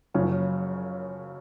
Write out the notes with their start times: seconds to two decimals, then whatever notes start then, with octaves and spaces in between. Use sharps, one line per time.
0.14 F#1 F#2 C#3 F3 C#4